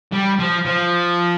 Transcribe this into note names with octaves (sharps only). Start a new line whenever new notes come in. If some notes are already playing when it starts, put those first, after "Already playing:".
G3
F3
F3